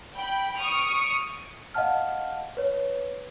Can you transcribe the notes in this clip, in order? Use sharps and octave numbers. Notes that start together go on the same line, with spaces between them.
G5 B5
C#6 D#6 F6 C#7 D7
D#5 F5 F#5 A5 F6
B4 C#5